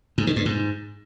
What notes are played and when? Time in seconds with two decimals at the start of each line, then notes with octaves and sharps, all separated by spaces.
0.18 G#2
0.27 D#3
0.36 G2
0.46 G#2